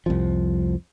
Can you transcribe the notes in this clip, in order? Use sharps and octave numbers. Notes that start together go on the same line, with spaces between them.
C2 F2 F3